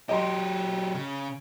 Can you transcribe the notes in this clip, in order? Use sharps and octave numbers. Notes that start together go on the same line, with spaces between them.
F#3 G4 D#5 A#5 C6
C#3